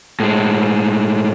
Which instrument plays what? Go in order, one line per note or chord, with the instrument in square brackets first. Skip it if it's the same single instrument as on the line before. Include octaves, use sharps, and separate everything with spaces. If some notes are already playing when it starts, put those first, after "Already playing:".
[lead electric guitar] A2 G#3